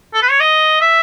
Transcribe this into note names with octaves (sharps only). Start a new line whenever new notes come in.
A4
B4
C#5
D#5
E5